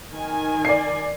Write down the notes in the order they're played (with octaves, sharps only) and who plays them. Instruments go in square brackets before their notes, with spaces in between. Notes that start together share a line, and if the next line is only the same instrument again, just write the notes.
[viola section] D#3 G#5
[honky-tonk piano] D5 C7